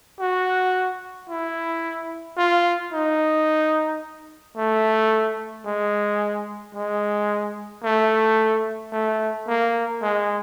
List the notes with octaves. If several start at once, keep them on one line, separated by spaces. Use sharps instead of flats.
F#4
E4
F4
D#4
A3
G#3
G#3
A3
A3
A#3
G#3